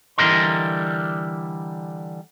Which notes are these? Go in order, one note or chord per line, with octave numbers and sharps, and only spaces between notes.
D3 E3 G3 A#4 D#5 C6